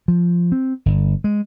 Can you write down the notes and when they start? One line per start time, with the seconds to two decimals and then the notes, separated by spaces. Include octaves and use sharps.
0.08 F3
0.52 C4
0.86 G1
1.24 G#3